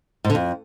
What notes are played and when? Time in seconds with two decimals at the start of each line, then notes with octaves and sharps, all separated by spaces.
0.25 G#2
0.30 D3
0.35 F2